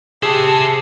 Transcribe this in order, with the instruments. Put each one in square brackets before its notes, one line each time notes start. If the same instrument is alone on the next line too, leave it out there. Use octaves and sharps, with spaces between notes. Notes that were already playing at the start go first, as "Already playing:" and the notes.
[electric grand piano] G4 G#4 [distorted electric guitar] C5 E5 [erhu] A5